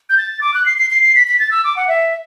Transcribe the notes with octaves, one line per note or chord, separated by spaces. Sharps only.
G6
A6
D6
F#6
C7
C7
C7
C7
B6
B6
A6
E6
D6
F#5
E5